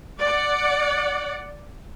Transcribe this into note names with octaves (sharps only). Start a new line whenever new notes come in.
D5 F#5